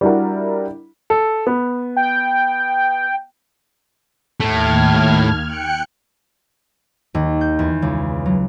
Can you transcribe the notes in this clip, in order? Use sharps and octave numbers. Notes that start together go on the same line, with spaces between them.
G3 D4 E4 F#4 A#4
A4
B3
G5
D#2 A2 A3 F6 G#6
G5 F#6 C#7
D#2
G6
E2
C#2
F#3